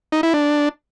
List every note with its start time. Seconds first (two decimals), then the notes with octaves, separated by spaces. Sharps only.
0.12 D#4
0.23 E4
0.34 D4